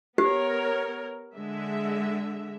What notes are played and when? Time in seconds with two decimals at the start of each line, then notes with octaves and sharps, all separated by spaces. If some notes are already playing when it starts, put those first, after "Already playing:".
0.18 B3 G4 A#4 C#5
1.36 D3 G#3 E5